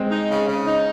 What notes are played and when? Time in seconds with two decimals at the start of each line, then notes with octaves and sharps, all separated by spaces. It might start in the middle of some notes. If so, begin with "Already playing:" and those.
Already playing: G#3 C4
0.11 D#4
0.29 C#3
0.47 C#3
0.66 D#4